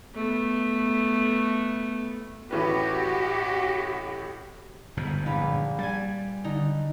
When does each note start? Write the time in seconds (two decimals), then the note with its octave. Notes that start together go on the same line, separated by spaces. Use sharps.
0.15 A3 B3
2.51 A1 A2 F#4 G4 B4
4.97 G1 G#2 B2
5.26 A#1 B4
5.79 G3 G#5 A6
6.44 D3 D#4